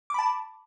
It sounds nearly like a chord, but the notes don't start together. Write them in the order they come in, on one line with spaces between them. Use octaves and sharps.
D6 B5 A5